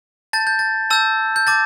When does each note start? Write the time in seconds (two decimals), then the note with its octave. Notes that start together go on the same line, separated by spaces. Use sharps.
0.33 A5 G6 A6
0.47 G6
0.59 A6
0.90 A5 E6 G6
1.36 G6
1.47 A5 D6 G6 A6